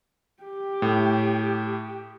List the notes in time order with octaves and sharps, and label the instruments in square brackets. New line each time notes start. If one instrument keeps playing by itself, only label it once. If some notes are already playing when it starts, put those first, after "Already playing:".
[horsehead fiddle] G4
[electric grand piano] A2